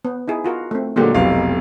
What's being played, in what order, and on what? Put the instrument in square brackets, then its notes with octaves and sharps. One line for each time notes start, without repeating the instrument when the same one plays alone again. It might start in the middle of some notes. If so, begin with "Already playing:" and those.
[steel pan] B3
D#4 E4 G#4
F4 F#4 A#4
A3 C4
[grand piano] A#2 D3 F#3 [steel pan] G#3 A#3 G4
[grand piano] F1 B1 F5 [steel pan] F#3 B3 E4